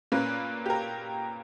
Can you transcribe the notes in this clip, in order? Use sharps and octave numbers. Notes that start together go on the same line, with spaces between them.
A#2 A#3 C#4 B4
G4
A#4